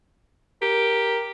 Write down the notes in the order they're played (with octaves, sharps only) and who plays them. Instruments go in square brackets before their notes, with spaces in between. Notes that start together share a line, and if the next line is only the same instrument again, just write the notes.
[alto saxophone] G4 [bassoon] A#4